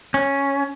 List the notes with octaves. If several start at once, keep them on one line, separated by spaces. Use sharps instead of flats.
C#4